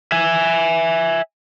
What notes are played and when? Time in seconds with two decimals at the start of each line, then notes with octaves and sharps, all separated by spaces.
0.12 E5 G#5